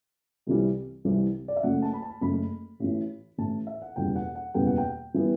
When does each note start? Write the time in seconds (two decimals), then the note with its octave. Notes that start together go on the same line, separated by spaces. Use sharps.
0.47 C2 C3 E3 G3
1.05 C2 C3 E3 G3
1.48 D5
1.56 E5
1.63 F#1 F#2 F#3 A3 F#5
1.82 A5
1.93 B5
2.02 A5
2.21 F#1 F#2 F#3 A3 B5
2.80 A1 A2 E3
3.38 A1 A2 E3 A5
3.67 E5
3.82 F#5
3.96 F#1 E2 B2 G3 B3 G5
4.16 F#5
4.35 F#5
4.54 F#1 E2 B2 G3 B3 G5
4.67 F#5
4.78 G5
5.14 E3 G3 B3